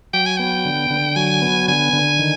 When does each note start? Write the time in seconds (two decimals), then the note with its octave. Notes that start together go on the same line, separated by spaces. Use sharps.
0.13 F#3 G5
0.26 G#5
0.37 B3 G5
0.65 D3
0.90 D3
1.16 F#3 G#5
1.42 B3
1.68 D3 G#5
1.93 D3
2.19 D#3